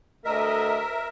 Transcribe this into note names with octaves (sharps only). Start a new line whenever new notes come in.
D2 A3 A#4 D#5 E5